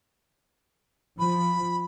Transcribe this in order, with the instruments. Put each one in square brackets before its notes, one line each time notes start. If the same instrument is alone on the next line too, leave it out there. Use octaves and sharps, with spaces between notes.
[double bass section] F3 [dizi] B5